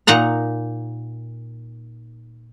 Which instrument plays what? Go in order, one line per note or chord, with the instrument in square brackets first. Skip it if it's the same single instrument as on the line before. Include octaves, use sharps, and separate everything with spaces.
[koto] A#2 D#4 F#5 A#5